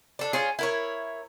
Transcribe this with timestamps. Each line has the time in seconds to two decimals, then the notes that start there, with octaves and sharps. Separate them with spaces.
0.19 D4 A4
0.33 C#4 F4 G#4
0.59 E4 A#4 C#5